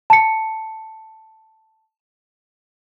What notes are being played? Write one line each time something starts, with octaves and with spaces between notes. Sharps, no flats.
A5 C#7